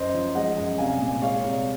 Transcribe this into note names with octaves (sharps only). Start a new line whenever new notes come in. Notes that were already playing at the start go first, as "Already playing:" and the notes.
Already playing: F#2 C5 D#5
F3
G#3 D#5 F#5
F#2
C2 F5 G#5
A#2
G#3 C#5 F5
C2